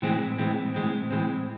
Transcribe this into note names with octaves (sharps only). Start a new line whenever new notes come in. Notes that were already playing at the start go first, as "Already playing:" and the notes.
A2 E3 G#3 C4
A2 E3 G#3 C4
A2 E3 G#3 C4
A2 E3 G#3 C4